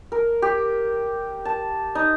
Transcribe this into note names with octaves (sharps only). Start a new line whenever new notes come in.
A#4
G4
A5
D#4